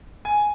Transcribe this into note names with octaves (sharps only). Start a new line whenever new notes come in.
G#5